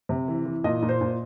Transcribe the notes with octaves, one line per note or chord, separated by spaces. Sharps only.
C3
E3
E3
A#2 D#5
A#2
C5
A#2